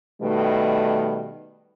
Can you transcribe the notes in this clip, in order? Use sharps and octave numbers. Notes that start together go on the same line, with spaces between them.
B2 D#3 G3 A3